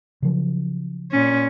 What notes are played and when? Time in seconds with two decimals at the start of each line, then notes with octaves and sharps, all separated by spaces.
0.22 C#3 F3 F#3
1.11 A#2 C#4